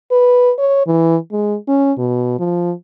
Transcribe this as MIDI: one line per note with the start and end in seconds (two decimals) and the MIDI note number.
0.11 0.52 71
0.58 0.84 73
0.87 1.17 52
1.32 1.56 56
1.68 1.92 61
1.98 2.36 47
2.39 2.73 53